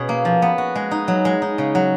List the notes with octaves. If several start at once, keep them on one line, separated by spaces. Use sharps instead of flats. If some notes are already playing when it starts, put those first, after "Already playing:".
Already playing: B2 C#4 G#4
A#3
F3
B3
F#4
G#3
D#4
F#3
G#3
D#4
C#3
F#3